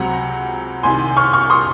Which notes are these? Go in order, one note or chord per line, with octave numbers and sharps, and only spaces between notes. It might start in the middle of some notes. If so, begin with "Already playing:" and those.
Already playing: C#2 C3 F#3 C4 F#5 A#5
C2 C3 D#3 G#5 C6
C#6 F6
C#6 F6
C6 D#6